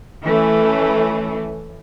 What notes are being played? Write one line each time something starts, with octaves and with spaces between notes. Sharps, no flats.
E3 A3 C#4